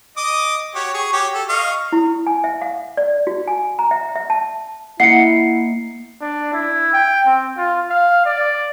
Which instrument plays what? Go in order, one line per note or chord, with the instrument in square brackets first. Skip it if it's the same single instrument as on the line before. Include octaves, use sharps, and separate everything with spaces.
[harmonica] D#5 D6 D#6
F#4 G4 C#5
G#4 C#6
F#4 G4 C#5
A4
D#5 F5 C#6
[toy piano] E4
G#5
E5
F5
D5
F#4
G#5
A#5
E5
E5
A5
[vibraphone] A#3 [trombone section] E4 [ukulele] D#5 F#5 [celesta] C7 C#7
[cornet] D4
E4
G5
C4
F4
F5
D5